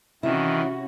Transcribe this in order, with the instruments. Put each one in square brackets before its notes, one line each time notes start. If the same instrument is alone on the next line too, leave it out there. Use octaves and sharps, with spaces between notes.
[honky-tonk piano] C3 [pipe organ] D#3 E3 [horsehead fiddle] C#4 F#4 [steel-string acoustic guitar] E4